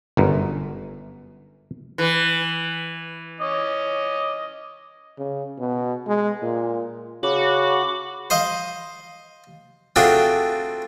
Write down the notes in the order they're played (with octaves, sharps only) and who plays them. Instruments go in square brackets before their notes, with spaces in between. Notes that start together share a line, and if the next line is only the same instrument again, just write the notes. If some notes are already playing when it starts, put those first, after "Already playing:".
[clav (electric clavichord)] G1 F#2
[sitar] E3
[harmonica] C#4 D#5 D6
[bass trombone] C#3
B2
G#3
A#2
[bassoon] C#3 [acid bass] F#4 [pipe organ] B5 D6
[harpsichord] C5 D#5 F5
A3 C4 D4 F4 F#4 G#4